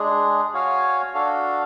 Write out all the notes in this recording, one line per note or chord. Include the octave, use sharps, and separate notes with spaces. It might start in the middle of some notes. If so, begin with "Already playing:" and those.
Already playing: G#3 D4 G#4
F#4 C#5 F5 G#5
D4 F#4 A4 F5